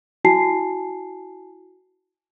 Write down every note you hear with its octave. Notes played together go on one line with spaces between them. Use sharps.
E4 F#4 G#5 A5 C7